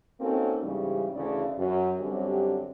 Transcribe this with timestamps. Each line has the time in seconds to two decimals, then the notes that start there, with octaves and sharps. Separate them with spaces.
0.20 A#3 C4 C#4 D#4 F#4 A4
0.62 G#2 C#3 E3 G3
1.15 D2 C#3 E3 A3 D5
1.58 F#2
2.00 F#2 D3 G3 C4 G4